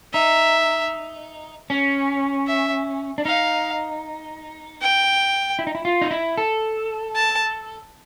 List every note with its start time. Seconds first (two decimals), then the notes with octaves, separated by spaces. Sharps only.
0.13 D#4 E5
1.70 C#4
2.47 E5
3.18 D4
3.25 D#4 F5
4.82 G5
5.59 E4
5.67 D#4
5.75 E4
5.85 F4
6.02 D#4
6.11 E4
6.38 A4
7.15 A5